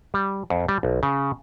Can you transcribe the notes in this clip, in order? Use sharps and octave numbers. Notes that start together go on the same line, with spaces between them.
G3
F2
G3
B1
C#3